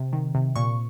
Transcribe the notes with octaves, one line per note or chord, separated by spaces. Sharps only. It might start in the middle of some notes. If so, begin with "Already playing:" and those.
Already playing: C3
D#3
C3
A#2 C#6